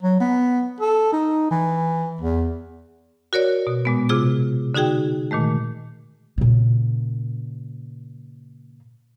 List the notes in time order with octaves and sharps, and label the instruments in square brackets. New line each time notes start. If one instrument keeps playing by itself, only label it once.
[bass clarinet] F#3
B3
A4
D#4
E3
E2
[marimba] F#4 A#4 C#5 D5
B2
A#2 G#3 B3
C3 F4 G#4 D6
D3 D#4 F#4 G#4 G5
A#2 D#3 G#3 A3
[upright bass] A#2 C#3